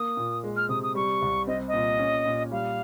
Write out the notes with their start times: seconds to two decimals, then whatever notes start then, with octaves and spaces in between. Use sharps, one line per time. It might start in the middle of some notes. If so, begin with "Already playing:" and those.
Already playing: A#3 D#6
0.17 A#2
0.44 G#3
0.56 F6
0.69 C3 D#6
0.83 D#6
0.95 G3 C#6
1.22 C2
1.47 C4 D#5
1.68 D#5
1.73 A#2
1.99 C#4
2.26 A#2
2.51 G3 F5